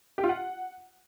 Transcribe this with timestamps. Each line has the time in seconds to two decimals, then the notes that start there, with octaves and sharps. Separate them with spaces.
0.18 G4
0.23 F4
0.29 F#5